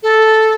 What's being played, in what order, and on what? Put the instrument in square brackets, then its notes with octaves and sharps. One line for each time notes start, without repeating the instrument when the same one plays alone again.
[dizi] A4